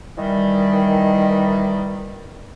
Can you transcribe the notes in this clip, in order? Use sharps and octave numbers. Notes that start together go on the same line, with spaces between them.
D#3 E3 G3